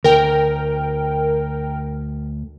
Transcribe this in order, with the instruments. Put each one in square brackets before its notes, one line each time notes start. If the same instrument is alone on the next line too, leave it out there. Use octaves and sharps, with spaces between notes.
[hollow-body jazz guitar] D2 [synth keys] A#4 G5